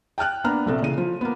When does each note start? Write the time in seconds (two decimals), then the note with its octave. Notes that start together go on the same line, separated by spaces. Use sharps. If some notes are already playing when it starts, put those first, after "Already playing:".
0.18 G5 A5 F6 F#6
0.44 A#3 B3 D4 A#5 F6
0.66 A#1 C3 A4
0.82 C#3 E3 D#7
0.98 F3
1.21 A#3 B3